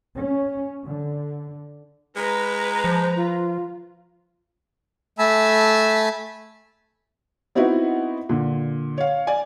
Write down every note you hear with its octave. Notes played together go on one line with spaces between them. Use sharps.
C#4
D3
G#3 B4 A#5
F3 C5
F4
A3 E5 G#5 A5 B5 E6
B3 C4 D#4 E4 F#4 B4
A#2 D3
C#5 F5
D5 G#5